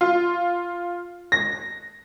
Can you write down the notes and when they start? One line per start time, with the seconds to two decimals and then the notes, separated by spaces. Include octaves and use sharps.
0.01 F4
1.32 A#6